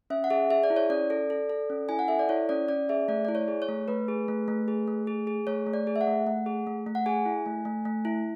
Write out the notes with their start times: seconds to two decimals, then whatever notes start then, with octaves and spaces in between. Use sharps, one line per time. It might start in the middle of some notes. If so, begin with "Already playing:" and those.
0.10 C#4 E5
0.24 F#5
0.30 G#4 E5
0.50 G#4 E5
0.64 D5
0.70 E4
0.76 C#5
0.90 C#4 D5
1.10 A4
1.30 A4
1.50 A4
1.70 C#4
1.89 E4 G#5
1.99 F#5
2.08 A4 E5
2.19 D5
2.29 E4 C#5
2.49 C#4 D5
2.68 C#4 D5
2.89 G#4 E5
3.08 A3 D5
3.25 E4 D5
3.35 C#5
3.48 G#4
3.62 C#5
3.69 A3
3.88 A3 B4
4.08 G#4
4.28 A3
4.48 A3
4.68 G#4
4.87 A3
5.07 G#4
5.27 G#4
5.47 A3 C#5
5.66 A3
5.73 D5
5.87 G#4
5.96 E5
6.01 F#5
6.07 A3
6.27 A3
6.46 G#4
6.67 A3
6.87 A3
6.95 F#5
7.06 G#4 G#5
7.26 E4
7.46 A3
7.65 A3
7.85 A3
8.05 E4